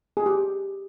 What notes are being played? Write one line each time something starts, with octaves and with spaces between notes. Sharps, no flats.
G#4
G4